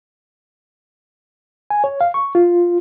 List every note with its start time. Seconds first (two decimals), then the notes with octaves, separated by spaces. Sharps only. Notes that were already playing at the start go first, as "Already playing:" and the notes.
1.70 G#5
1.84 C#5
2.01 F5
2.14 C#6
2.35 F4